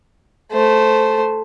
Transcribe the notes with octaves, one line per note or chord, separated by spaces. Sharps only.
A3 C5